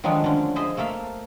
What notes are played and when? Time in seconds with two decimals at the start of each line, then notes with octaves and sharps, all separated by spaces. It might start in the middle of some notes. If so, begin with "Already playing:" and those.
0.04 D#3 F3 F#3 G#3 A3 D4
0.24 D3 C#4
0.56 G#4 C5 D#5 E5 G#5
0.77 A3 A#3 A4 E5 F5